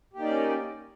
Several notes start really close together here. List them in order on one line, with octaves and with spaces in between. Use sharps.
G4 A#3 D#4 D5 C#4